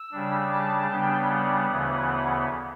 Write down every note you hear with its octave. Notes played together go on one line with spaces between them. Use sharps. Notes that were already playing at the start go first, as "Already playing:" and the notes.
Already playing: E6
C#3 G3 D4
A5
C#3 G3 B3 D4 G5
F#5
D2 C#3 E3 B3